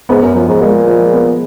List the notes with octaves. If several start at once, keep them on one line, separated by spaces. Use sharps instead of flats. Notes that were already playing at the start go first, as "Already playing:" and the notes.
G#2 B3
F#2
F#2 F3
G#2
A#2 G#3
F3
B3